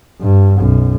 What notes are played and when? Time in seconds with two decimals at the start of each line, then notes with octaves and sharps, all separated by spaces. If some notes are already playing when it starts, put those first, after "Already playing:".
0.21 G2
0.58 B1 F#2